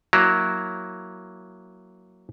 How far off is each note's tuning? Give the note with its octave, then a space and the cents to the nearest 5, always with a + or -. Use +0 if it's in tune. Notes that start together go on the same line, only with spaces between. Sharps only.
F#3 +0 A#3 +0 E4 +0